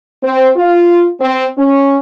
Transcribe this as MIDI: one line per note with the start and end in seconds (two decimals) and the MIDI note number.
0.23 0.49 60
0.56 1.08 65
1.20 1.46 60
1.57 1.98 61